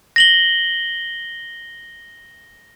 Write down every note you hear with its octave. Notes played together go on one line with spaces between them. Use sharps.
A#6 F#7 G7